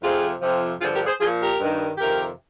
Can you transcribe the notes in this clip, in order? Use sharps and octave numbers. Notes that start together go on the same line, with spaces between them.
F2 C3 F3 F4 G#4
F2 C3 F3
G2 D3 F3 F4 G#4
G4 A#4
G#4 C5
F3 F4 G#4
A#2
G4 A#4
G2 D#3
F2 C3 D#3 G4 A#4